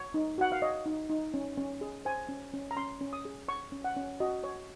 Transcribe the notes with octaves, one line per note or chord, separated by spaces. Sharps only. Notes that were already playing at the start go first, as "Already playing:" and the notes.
Already playing: C#5
D#4
F#4 F#5
F5
C#5 D#5
D#4
D#4
C#4
C#4
G#4
C5 G#5
C#4
C#4
A#5
C#4 C6
C#4
D#6
G#4
C#5 C#6
C#4
F#5
C#4
F#4 D#5
C#5